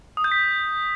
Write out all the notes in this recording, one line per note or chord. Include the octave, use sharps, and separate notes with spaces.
D#6
G6
B6